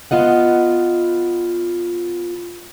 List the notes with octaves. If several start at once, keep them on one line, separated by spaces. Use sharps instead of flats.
B3 F4 D#5 F#5